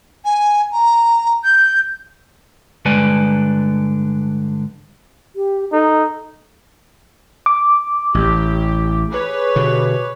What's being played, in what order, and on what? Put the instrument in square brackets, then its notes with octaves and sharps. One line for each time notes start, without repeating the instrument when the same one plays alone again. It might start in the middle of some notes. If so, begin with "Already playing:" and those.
[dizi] G#5
A#5
G6
[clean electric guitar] G2 D3 G#3 B4 D5 G#5
[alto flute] G4
[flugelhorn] D#4 [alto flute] A4
[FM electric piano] D6
[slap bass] A1 [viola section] G4
[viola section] G#4 B4 C#5
[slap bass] B2 D3